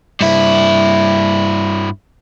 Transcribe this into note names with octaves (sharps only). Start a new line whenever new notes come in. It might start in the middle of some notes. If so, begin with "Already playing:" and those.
G2 E4